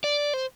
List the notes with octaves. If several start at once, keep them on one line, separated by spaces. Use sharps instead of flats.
D5
C5